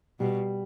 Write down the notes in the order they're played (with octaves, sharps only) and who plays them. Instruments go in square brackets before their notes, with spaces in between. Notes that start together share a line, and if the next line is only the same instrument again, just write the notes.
[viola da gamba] B2 [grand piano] G3